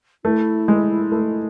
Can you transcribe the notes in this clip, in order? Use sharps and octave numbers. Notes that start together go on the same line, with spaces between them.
A3 E4
G#3
A3